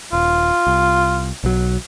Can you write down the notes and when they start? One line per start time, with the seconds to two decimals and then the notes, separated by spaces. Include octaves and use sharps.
0.13 D#1 F4
0.67 C2
1.44 B1 F#3